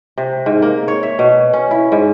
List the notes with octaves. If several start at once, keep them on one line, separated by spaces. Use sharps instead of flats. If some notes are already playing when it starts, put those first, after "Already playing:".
C3
G#2
A#3
C#5
E5
B2
C#4
E4
G#2